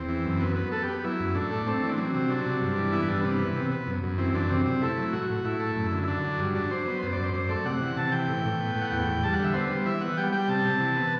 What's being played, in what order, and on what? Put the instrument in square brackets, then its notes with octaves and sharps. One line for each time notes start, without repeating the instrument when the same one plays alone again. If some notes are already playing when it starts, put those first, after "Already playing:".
Already playing: [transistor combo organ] E2 C4
E3
F#2
B3
B3
B3 A4
G4
B3
F#3 E4
F#2
A2 D4
A3
A3 C4
E3
D4
F#3 C4
C3
F#3 D4
C3
G2
E3
B3 E4
G2 D4
C3 B3
E3
C3
B3
F#2
F#2
E3 C4
F#2 D4
C3 C4
C3
A3 E4
F#3
A2 F#4
A2
A2 E4
A3
F#2
D3
E4
D3 D4
F#3
G2
F#3 D4
F#3 C5
B3
F#2 C5
D5
F#2
C5
F#2 C5
A3 D5
C3 F#5
E3
C3 A5
E3 G5
A2
A2
B3
A2
F#5
E2 G5
E2
G3 A5
F#5
D3
E5
B3 C5
G3
E3 E5
B3 F#5
G3 G5
G3 G5
C3 A5
C3
E3
B3